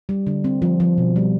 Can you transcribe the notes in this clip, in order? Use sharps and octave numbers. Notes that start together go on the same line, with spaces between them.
G3
D3
C4
F3
F3
B2
G3